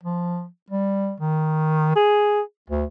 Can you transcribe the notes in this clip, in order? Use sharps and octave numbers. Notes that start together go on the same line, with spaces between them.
F3
G3
D#3
G#4
D2